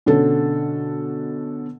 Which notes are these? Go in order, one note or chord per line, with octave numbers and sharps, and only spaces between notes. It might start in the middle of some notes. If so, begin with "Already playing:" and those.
B2 D3 C#4 A4